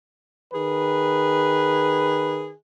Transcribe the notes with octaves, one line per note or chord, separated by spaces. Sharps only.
D#3 G#4 B4